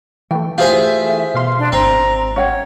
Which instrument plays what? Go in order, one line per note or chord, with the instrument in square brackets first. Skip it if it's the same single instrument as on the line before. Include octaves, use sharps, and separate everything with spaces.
[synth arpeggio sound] E3 A3 [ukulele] G5
[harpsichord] F4 G#4 G#5 [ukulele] G4 C5 [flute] E5
[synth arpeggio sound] B2 F5 C6
[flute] D4
[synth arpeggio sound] G#1 [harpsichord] C4 [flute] A#5
[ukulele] C#4 F#5 G5 [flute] C#5